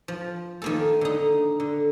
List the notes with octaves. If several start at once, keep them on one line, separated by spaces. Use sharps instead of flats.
F3
D#3 A#3 A4
D3 D#4
D3